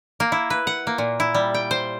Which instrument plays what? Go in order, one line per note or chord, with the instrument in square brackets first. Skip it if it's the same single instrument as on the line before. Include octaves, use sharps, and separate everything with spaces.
[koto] A#3
E4
B4
F#5
A#3
A#2
E4
G3
G5
C5